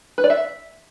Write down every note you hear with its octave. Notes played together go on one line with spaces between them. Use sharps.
B4
D5
E5